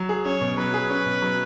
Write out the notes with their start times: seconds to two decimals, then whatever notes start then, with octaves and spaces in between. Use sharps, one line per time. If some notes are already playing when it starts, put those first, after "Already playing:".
Already playing: F#3
0.09 G#4
0.25 C#4 C#5
0.41 B2
0.58 F#3 B4
0.74 G#4
0.90 C#4
1.06 B2
1.22 F#3